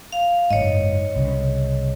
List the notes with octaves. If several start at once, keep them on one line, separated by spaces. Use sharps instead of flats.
F5
F#1 G#2 C#5 D#5
C2 C#3